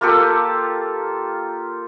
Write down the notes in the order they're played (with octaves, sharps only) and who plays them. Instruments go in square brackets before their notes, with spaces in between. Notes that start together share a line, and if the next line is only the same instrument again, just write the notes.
[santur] A#3 F4 G4 A4